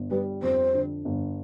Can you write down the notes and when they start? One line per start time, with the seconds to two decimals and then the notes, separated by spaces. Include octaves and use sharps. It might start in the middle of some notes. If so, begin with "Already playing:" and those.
Already playing: G1
0.11 G3 B4
0.43 F2 C5
0.74 D3
1.05 G1